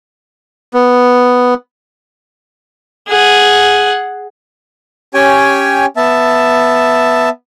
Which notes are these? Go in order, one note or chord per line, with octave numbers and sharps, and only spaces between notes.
B3
G#4 F#5
C#4 G4 C#5 G5 G#5
B3 E5 A5